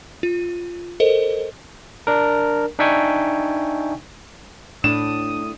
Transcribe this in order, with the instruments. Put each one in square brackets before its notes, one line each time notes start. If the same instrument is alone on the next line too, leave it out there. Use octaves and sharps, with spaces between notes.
[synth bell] F4
A4 A#4 C5 D#5
[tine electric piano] D4 A#4
D4 D#4 E5 G5 G#5 C#6
[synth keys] A2 [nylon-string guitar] D4 [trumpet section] D#6 [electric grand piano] E7